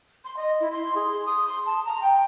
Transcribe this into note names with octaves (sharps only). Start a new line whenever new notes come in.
C6
D#5
E4
C6
G#4
C6
D#6
C6
A5
A#5
G5